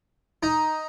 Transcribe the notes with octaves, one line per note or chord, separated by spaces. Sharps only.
D#4